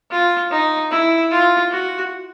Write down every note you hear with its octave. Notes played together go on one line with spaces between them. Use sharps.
F4
D#4
E4
F4
F#4